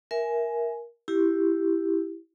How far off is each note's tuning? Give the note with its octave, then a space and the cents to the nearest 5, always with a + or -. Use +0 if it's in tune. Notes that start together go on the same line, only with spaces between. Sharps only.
A#4 +15 E5 +0 G#5 +10
E4 +0 G4 +0